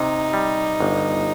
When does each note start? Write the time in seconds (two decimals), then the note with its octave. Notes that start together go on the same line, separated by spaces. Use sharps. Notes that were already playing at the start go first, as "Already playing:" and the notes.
Already playing: C3 D#4
0.33 G3
0.80 G1